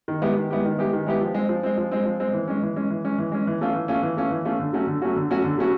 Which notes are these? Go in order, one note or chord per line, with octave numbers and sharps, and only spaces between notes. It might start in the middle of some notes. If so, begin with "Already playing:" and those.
D#3
G#3 B3 E4 G4
D#3
G#3 B3 E4 G4
D#3
G#3 B3 E4 G4
D#3
G#3 B3 E4 G4
F3
G#3 C4
F3
G#3 C4
F3
G#3 C4
F3
G#3 C4
E3
G#3 C#4
E3
G#3 C#4
E3
G#3 C#4
E3
G#3 C#4
E3
A3 C#4 F4
E3
A3 C#4 F4
E3
A3 C#4 F4
E3
A3 C#4 F4
D3
F#3 A3 C#4 F#4
D3
F#3 A3 C#4 F#4
D3
F#3 A3 C#4 F#4
D3
F#3 A3 C#4 F#4